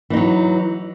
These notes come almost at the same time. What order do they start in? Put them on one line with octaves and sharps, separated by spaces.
E3 D#4 F#3